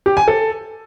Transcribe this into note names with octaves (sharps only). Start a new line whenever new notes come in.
G4
G#5
A4